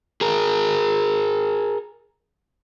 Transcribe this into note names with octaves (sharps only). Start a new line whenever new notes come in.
G#4 A#4